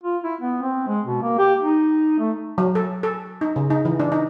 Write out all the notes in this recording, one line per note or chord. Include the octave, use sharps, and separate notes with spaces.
F4
E4
B3
C4
G#3
B2
A#3
G4
D#4
A3
F#3
A4
A4
D#4
C#3
D#4
E3
D4
D#4